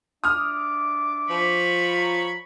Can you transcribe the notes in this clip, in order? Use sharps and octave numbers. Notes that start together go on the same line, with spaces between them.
D4 E5 D6 D#6 F6
F3 B5 C#6
C#5 A#5